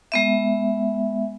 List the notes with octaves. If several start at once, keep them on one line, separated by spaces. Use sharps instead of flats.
G#3 B3 E5